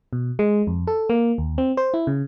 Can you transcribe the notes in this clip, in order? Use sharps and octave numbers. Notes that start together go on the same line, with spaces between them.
B2
G#3
F2
A4
A#3
D#2
C4
C5
E4
C#3